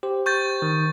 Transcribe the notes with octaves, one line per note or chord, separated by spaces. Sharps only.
G4 C5
C#6 G6 A6
D#3